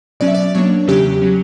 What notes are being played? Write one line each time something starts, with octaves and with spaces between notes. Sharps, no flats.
B2 F#3 C#4 D5
E5
D5
B2 F#3 A#3 D4 C#5
E2 C#3 F#3 C#4 G4
F#3 C#4